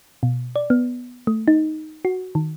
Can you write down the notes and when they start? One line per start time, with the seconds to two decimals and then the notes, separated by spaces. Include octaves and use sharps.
0.23 B2
0.56 D5
0.70 B3
1.27 A3
1.48 D#4
2.05 F#4
2.35 D#3